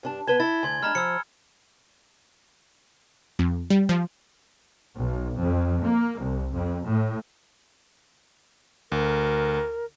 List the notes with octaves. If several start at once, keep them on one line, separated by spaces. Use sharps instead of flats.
G2 D4 A5
B3 B4 A5 G#6 G7
E4 A6
D2 G#5 C6 G#6
G#3 D4 A#5 B5 F6
F3 E6 C#7
F2
G3
F3
B1
F2
A#3
C2
F2
A2
D2 A#4